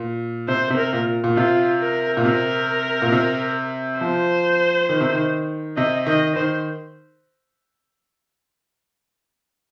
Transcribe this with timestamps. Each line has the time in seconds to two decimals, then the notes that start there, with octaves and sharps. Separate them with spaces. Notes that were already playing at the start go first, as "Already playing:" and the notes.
Already playing: A#2
0.48 C3 C5
0.70 C3
0.77 A#4
0.93 A#2
1.24 A#2
1.36 C3 F4
1.80 A#4
2.17 A#2
2.25 C3 A#4
3.02 A#2
3.12 C3
4.00 F3 C5
4.89 D#3
5.01 C3
5.13 D#3
5.77 C3 D#5
6.06 D#3 D#5
6.36 D#3 C5